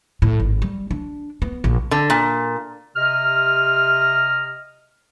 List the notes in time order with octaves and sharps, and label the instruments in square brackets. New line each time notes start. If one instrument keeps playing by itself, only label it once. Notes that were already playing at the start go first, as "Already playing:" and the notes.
[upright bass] A2
G#1
G3
D4
B3
A#1
[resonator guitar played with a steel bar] D3
A#2
[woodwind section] C3 D#5 F6